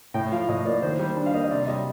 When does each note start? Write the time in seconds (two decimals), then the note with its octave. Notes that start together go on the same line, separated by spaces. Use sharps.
0.14 A2 G5
0.32 F3 F5
0.48 A2 D#5
0.65 A#3 D5
0.82 D#3 C5
0.99 G3 C5
1.17 D4
1.26 F5
1.34 A#3 D#5
1.44 D#5
1.51 C3 D5
1.68 G3 D#5